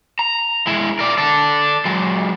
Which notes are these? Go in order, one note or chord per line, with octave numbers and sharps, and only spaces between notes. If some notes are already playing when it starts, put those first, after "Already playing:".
A#5
G#3 E4
A#4 D5
A4 D5
F#3 G#3